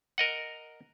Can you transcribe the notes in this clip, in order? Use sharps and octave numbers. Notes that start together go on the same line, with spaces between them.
A#4 D#5 F#5